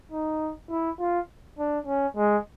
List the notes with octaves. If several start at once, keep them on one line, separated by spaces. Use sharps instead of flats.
D#4
E4
F4
D4
C#4
G#3